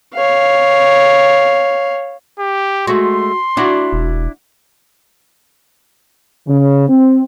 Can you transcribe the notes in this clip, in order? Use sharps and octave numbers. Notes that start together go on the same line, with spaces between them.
C#5 F5
G4
G#3 A3 F#4 C6
D4 E4 F#4 D5
E1
C#3
C4